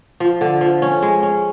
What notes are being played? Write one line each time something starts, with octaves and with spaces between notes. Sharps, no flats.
F3
D3
F3
C#4
G#3
C#4